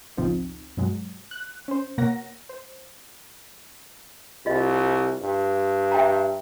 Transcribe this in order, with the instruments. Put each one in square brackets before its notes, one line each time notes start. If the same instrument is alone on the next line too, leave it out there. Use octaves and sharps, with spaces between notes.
[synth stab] G#1 C#2 B2 F3 C4 D#4
G2 B2 F#3 G#3
F#6
C#4 C5
B2 A#3 A#4 C#5 F#5 A#6
C5
[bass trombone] C2 [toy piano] F4 D#5
[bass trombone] G2
[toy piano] E5 G5 A#5